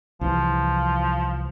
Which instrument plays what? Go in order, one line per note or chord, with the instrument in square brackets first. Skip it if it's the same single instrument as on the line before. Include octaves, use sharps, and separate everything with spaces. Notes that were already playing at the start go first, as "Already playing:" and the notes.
[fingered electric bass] C2 E3 [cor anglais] F3